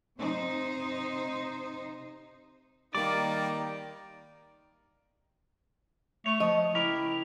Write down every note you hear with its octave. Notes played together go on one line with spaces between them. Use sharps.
C3 D#4 C5
D#3 G3 A#3 D5 D6
A3 C#5
F3 D#5
C#2 E4 G4 A#4